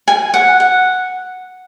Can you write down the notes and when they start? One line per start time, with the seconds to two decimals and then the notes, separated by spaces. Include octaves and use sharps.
0.08 G#5
0.34 F#5
0.60 F#5